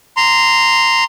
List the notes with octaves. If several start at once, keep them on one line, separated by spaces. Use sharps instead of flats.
A#5 C6